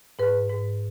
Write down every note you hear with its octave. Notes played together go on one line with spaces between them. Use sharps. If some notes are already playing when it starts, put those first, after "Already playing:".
G#2 B4
G#2